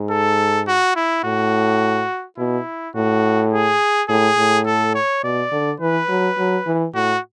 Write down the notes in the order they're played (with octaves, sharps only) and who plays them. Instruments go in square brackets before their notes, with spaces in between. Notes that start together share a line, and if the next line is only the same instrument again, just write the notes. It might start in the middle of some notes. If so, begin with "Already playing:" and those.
Already playing: [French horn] G#2
[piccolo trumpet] A4
F#4
E4
[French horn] A2 [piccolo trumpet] F#4
[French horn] B2 [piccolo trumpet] E4
[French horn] A2 [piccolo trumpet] F#4
[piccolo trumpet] G#4
[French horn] A2 [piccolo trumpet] G#4
[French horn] A2
[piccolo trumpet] A4
C#5
[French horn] B2 [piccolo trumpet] D5
[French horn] D3
[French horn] E3 [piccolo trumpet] B4
[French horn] F#3
F#3
E3
[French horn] A2 [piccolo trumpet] F#4